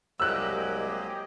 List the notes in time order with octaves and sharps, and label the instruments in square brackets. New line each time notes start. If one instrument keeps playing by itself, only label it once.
[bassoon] C2 [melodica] F#3 G#3 A#3 [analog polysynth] G4 D#5 [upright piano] E6 F#6